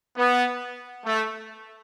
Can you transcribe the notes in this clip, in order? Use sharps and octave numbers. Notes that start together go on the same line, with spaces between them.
B3
A3